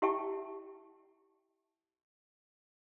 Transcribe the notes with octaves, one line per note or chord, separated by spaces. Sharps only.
E4 G4 E5 G5 A5 C#6